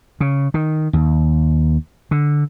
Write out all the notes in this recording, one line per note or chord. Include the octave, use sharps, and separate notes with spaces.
C#3
D#3
D#2
D3